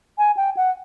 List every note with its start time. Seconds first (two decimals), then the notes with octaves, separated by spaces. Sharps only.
0.18 G#5
0.37 G5
0.57 F#5